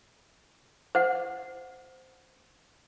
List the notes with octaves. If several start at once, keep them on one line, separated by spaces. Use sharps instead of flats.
C5 F#5